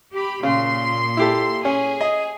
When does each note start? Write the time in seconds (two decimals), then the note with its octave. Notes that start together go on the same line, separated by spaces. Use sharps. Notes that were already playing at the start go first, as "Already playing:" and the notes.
0.13 G4 B5
0.43 A#2 C#3 C6
1.17 E4 G4 A4
1.65 C#4 G#4
2.01 D#5